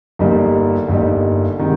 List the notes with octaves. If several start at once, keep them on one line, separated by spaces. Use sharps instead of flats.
G1 G2 G3 A#3 D#4
G1 G2 G3 A#3 D#4
C3 D#3 G#3